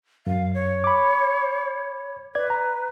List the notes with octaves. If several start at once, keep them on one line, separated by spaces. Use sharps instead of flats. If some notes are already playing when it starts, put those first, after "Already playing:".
F#2 F5
C#5
B5 D6
B4 D5 G#6
A#5